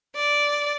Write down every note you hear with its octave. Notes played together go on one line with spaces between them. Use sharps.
D5